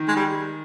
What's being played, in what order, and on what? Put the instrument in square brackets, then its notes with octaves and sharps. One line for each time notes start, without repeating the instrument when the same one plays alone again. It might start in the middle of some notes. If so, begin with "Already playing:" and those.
Already playing: [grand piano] D#3
[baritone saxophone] G#3
G3